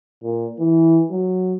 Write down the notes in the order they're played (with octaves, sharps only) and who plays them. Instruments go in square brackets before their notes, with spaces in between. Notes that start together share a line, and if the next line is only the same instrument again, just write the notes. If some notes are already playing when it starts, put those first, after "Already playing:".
[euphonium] A#2
E3
F#3